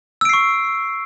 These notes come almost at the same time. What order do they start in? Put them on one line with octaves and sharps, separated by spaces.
E6 D7 C7 C#6